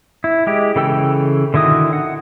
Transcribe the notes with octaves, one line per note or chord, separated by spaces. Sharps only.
E4
G#3 G4
C#3 E3 A4 G5 E6
D3 D#3 E4 F#4 D#6
F#5